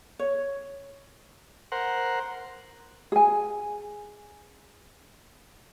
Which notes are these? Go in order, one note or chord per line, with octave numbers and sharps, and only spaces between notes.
C#5
A#4 C5 F#5
G#4 G#5